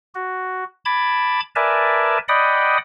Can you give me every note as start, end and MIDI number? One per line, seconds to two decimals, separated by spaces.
0.15 0.64 66
0.85 1.40 81
0.85 1.40 83
0.85 1.40 86
0.85 1.40 92
1.56 2.18 70
1.56 2.18 71
1.56 2.18 74
1.56 2.18 76
1.56 2.18 80
1.56 2.18 81
2.29 2.78 74
2.29 2.78 75
2.29 2.78 78
2.29 2.78 79
2.29 2.78 83
2.29 2.78 87